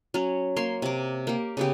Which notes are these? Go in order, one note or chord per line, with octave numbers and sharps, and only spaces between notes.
F#3 C#4
A#3 C#5 C6
C3 D6
A#3 G4
C#3 B3 G4